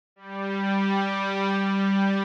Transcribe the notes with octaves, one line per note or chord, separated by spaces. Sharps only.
G3
G3
G3